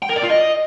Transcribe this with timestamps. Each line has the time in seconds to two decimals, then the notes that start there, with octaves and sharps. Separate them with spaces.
0.02 G5
0.09 A#4
0.16 D5
0.23 F4
0.30 D#5